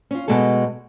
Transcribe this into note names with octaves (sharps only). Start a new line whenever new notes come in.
C#4 F4
B2 G#3 F#4 A4